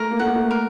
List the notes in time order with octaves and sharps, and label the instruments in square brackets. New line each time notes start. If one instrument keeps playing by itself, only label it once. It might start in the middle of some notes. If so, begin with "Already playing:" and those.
Already playing: [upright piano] A3 [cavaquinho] A#4
[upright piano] A#3
[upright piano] A3 [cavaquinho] F#5
[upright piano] A#3
A3
[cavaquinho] A#4